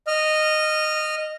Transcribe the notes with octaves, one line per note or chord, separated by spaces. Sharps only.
D#5 F6